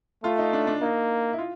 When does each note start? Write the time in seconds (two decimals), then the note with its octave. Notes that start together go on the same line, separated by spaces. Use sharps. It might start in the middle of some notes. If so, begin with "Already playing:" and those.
0.24 A3 F4
0.38 D#4
0.53 D4
0.67 D4
0.82 A#3 D#4
1.33 E4
1.38 F4